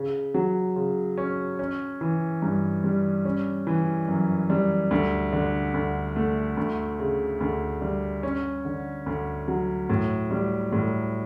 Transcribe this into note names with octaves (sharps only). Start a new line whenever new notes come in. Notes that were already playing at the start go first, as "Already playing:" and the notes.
Already playing: C#3
F#3
C#3
C#4
C#4
E3
G2
G3
C#4
E3
F#2
G3
D2
D3
D2
A3
D2
C#3
D2
G3
C#4
D3
D2
F#3
A2
G3
A2